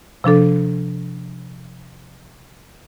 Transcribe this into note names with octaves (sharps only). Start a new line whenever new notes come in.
C3 F3 D4 A4